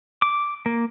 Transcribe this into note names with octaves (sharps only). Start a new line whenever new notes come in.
D6
A#3